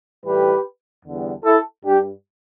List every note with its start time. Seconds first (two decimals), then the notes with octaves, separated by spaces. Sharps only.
0.25 A2 E3 G3 G4 B4
1.06 E2 D3 G3
1.45 E4 A4
1.85 G2 G3 D4 G4